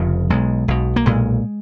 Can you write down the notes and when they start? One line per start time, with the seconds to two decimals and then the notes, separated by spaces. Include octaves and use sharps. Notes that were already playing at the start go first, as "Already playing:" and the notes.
Already playing: F1 F2 C#3 F3
0.30 B1 B2 G#3
0.68 B1 B2
0.96 A#3
1.06 B1 A#2 G#3